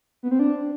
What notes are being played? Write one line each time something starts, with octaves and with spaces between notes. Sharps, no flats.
B3
C4
D4